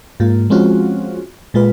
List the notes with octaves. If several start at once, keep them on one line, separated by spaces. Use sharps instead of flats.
G#2 A#3 F4
F3 G#3 C4 C#4 F4 F#4
A#2 G#3 F4 B4